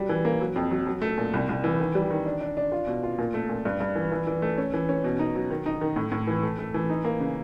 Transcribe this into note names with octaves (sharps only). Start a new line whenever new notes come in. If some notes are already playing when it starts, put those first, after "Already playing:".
Already playing: F#3 G3
E3
A#3
F#3
F2
F#3
F#3
A3
A#2
C2
C2
E3
D#3
G3
D#3
D4
D4
D4
F4
B2
F4
A#2
A3
A#2
G2
G2
E3
E3
E3
A3
C#4
E3
C#4
B2
D#4
F#3
D#3
D#4
D#3
A2
A2
E3
A3
A3
E3
D#4
A#3
C#3